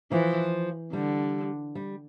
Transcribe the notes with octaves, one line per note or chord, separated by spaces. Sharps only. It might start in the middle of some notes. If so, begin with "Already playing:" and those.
E3 F3
D3 G3
G3